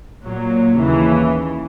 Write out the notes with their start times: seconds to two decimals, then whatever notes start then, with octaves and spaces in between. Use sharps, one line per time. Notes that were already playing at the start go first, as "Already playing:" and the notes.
0.24 A#2 F#3 A#3
0.77 D#2 C#3 E3